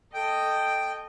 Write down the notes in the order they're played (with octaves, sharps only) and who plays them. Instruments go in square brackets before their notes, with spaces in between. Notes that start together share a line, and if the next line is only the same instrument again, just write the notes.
[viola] A4 D#5 [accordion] G5